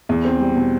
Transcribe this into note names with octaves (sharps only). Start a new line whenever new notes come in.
E2
C4
G3
B2